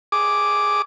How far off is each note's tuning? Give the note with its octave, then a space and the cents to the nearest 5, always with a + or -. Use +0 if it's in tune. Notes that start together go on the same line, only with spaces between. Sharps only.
G#4 +0 D6 +0